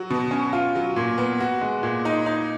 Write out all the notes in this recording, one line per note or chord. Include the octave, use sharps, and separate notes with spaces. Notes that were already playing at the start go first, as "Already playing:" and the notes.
Already playing: F#3 F#4
B2
C#4
F4
F#3
A#2
B3
F#4
G#3
A#2
D#4
D#4